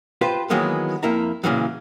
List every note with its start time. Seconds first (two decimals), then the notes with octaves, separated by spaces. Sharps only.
0.21 F4 G4 B4 C5
0.50 D#3 E3 F#3 G#3 A#3 B3
1.03 F2 A#3 E4 A#5
1.44 A#2 C#3 E3 F#3